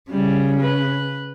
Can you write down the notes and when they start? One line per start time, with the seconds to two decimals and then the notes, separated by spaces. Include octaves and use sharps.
0.11 C#3 G3
0.61 B4